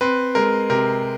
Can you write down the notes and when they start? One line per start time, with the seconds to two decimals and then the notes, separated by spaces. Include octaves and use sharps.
0.01 C4 B4
0.35 G#3 A#4
0.70 C3 A#4